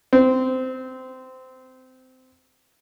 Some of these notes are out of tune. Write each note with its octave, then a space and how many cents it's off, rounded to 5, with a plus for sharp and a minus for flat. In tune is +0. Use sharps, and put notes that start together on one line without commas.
C4 -20